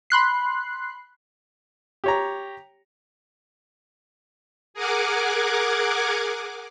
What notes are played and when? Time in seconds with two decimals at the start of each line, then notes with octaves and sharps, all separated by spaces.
0.10 B5 C6 F#6 C7
2.04 G4 C#5 A#5
4.74 G#4 A#4 F#5 G#5 D6